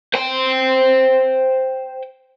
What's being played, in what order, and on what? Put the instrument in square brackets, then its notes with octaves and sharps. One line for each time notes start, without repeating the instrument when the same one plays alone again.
[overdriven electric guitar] C5 G5